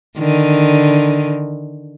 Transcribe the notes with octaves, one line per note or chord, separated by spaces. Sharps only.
D3 D#3